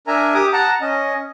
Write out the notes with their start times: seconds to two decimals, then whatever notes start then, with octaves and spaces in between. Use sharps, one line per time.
0.07 D4 A#4 E5 G#5 A#5
0.34 G4 D6 D#6
0.53 F#5 A5 A#5
0.81 C#4 D#5